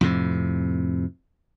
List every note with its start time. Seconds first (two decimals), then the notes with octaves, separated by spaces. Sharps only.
0.01 F2 A2 C3